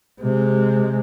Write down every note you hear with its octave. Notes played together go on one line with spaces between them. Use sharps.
C3 G#3